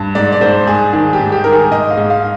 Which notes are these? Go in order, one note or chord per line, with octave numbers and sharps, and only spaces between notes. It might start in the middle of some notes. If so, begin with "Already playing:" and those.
Already playing: G2
G#2 D5
D5
G#2 C5
G#2 G#4
D#3 G#4
G4
G#2
G4
D#3 A#4
G#4
G#2 D#5
F5
G#2
F5